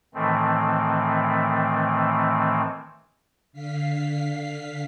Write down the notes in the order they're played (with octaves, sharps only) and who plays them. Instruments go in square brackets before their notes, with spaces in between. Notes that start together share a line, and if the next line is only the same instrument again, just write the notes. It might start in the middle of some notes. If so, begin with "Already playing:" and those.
[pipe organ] A2 D#3 E3 A3 C4
[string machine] D3 F5 B6 C7